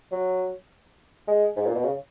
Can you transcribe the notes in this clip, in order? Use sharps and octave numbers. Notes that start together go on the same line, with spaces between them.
F#3
G#3
G#2
A#2
B2
C#3